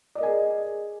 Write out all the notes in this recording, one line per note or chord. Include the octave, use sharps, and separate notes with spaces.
G#4 A#4 D5 D#5 G#5